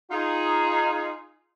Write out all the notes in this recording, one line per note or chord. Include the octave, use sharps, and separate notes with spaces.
D#4 F4 G#4